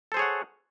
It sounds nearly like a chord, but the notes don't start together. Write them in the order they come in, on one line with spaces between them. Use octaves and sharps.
A4 C5 G#4 C#5 F#5